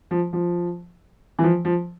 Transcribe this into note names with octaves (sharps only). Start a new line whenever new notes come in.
F3
F3
E3
F3
F3